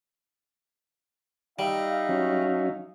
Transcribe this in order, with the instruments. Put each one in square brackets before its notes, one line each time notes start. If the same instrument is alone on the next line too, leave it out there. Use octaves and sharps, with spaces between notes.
[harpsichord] G3 [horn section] D#4 E5 F5
[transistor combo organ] F#3 C#4